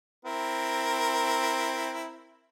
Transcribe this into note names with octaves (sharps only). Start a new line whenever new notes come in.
C4 E4 A#4